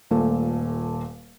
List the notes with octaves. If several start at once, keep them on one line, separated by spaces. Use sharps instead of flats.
D#1 A#2 A3